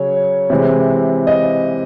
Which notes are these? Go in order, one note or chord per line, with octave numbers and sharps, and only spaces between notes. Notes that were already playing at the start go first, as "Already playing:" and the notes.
Already playing: C#3 F#3 C#5
C3 E3 G#3
D#5